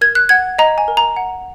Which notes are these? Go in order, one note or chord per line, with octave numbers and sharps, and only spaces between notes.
A#4 G#6
F#6
F#5 G#6
D#5 A#5
G#5
A#4
A#5
F#5